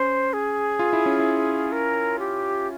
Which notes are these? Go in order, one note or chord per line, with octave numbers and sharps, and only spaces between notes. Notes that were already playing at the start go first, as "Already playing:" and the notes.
Already playing: C#4 C5
G#4
F4
E4
C#4
E4
A#4
G4